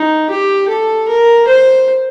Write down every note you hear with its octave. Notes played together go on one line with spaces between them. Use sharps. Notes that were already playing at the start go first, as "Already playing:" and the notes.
Already playing: D#4
G4
A4
A#4
C5